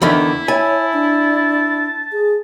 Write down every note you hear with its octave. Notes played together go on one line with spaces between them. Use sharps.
E2 D3 D#3 E4
E4 C#5 G#5 A5
D4
G#4